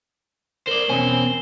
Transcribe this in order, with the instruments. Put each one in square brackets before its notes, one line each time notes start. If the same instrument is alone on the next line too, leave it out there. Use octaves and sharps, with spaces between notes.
[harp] A#4 [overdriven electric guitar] C5 D5 [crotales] E7 G7
[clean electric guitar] E2 B2 C#4 [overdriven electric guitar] C4 C5 [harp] G#5